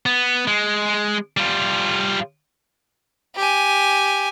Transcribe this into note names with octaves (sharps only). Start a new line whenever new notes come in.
B3
G#3
G3 F4
G4 G#5